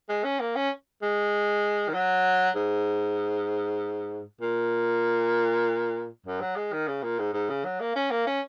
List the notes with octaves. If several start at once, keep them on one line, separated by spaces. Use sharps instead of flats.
G#3
C#4
A#3
C#4
G#3
D#3
F#3
G#2
A#2
F#2
F#3
G#3
D#3
C#3
A#2
G#2
G#2
C#3
F#3
A#3
C#4
A#3
C#4